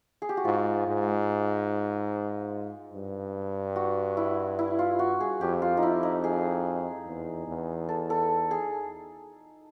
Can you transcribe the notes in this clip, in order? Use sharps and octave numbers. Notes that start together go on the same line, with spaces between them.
G#4
G4
F#4
G#2 F4
G#2
G2
F#4
E4
E4
F4
F#4
G#4
F2 G4
F4
D#4
E4
D#4
G#4
E2
E2
A4
A4
G#4